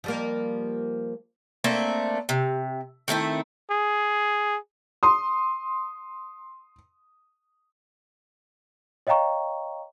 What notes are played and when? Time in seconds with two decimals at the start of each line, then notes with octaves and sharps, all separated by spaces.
0.04 F3 G3 A#3
1.64 A3 A#3 C4 D4
2.29 C3
3.08 D#3 A3 C4 E4
3.71 G#4
5.03 C6 D#6
9.07 C#5 D#5 F5 G5 A#5 C#6